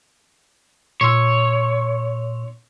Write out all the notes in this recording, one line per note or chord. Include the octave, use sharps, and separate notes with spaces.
A#2 C#5 C6 E6